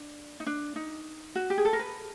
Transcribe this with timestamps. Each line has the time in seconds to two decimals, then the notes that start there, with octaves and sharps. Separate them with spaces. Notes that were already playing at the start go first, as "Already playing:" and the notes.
Already playing: D4
0.40 D#4
0.46 D4
0.76 D#4
1.35 F#4
1.50 G4
1.58 G#4
1.65 A4
1.73 A#4
1.79 B4